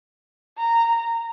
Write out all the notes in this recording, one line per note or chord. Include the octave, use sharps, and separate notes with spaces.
A#5